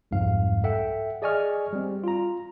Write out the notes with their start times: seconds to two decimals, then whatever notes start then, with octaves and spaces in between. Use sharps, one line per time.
0.11 C2 F2 G#2 F5
0.64 A4 E5 F#5 G5
1.22 G#4 D5 D#5 G#5 C#6 F6
1.73 G3 C4
2.04 F4 A#5